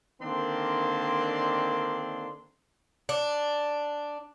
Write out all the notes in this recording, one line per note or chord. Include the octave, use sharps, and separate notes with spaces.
D3 D#3 A#3 C4 D4 C6
D4